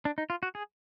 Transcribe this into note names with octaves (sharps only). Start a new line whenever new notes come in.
D4
D#4
F4
F#4
G#4